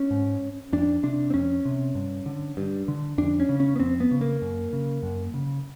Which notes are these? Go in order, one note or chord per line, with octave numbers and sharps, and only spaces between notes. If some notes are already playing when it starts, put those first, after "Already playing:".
Already playing: C#4
G#2
F2 D4
C3 D4
C4
F2 C#4
C3
G2
D3
G2
D3
F2 D4
C#4
C#3
C#4
B3
F2 C4
B3
C#3
A#3
F#2
C#3
F#2
C#3